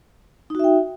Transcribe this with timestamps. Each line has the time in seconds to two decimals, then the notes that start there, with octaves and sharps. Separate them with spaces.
0.50 D#4
0.55 F#4
0.59 E5
0.64 G5